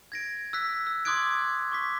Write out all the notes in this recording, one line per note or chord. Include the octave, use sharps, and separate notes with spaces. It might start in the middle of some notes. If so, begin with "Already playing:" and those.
G#6 A#6 D7
E6 F#6 B6
E6
C6 D6 D#6 F#6 G#6 D7
C#6 D6 B6